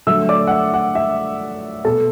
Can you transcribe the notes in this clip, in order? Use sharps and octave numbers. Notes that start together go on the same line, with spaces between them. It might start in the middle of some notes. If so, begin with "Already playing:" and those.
D3 F#3 A3 E5 E6
D5 D6
F#5
E5
F#5
E5
B2 B3 A4 A5